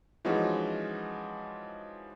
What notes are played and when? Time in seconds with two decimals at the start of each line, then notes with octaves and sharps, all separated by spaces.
0.25 E3 F3 G#3 C#4 D#4 F#4